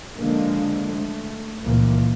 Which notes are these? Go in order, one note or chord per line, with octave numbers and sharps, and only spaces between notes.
D3 F3 G#3 A#3
A3
C#2 A#2 E3 F3 A#3